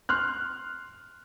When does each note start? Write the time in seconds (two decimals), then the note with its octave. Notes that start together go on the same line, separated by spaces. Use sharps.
0.09 C6 F6 F#6